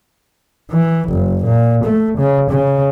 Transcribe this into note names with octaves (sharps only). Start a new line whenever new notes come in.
E3
F#1
A#2
A3
C#3
C#3